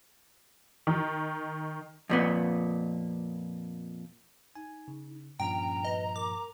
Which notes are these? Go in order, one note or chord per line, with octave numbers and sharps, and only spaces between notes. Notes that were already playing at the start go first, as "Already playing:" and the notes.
D#3
F2 A#2 B3
D#4 G#5
C#3
G2 A#2 F3 C#4 G5 A#5
B4 D#5
A#4 D6